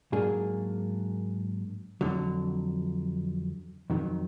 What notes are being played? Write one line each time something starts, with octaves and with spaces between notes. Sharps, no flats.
G#2 F#3 A#3 D4 G#4
F2 D3 F#3
F2 D#3 F#3